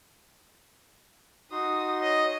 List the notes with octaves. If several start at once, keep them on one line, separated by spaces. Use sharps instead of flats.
D#4 F#4 C6 D#6
C#5 D#5